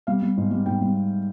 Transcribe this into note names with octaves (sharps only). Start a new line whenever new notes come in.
G3 F5
G3
G#2
G3
G#2 G5
G3